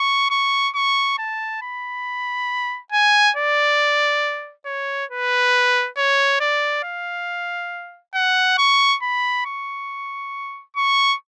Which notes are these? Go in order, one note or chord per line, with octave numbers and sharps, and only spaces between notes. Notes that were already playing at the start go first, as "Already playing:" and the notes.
Already playing: C#6
C#6
C#6
A5
B5
G#5
D5
C#5
B4
C#5
D5
F5
F#5
C#6
B5
C#6
C#6